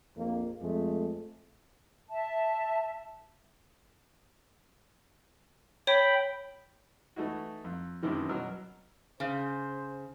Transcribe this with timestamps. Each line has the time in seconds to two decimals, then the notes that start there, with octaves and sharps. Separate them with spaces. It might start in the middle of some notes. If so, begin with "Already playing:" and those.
0.17 A#1 F2 A#3
0.61 F2 G#3 A3
2.09 E5 A5
5.87 C#5 G5 B5
7.16 E3 A3 D#4 E4 F#4
7.64 F2
8.03 F#2 A2 C3 D#3 E3
8.29 B2 F#3 A#4 E6
9.20 C#3 C5